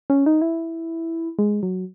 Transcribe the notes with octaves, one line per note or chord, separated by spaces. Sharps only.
C#4
D#4
E4
G#3
F#3